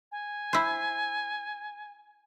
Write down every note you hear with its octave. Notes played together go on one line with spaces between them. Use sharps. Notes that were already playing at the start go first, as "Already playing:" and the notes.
G#5
E4 C5